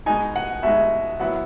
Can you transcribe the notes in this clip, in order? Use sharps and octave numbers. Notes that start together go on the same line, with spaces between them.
B2 G#3 D#4 G#5
F#5
B2 G#3 D#4 E5
F#3 B3 E4 F#5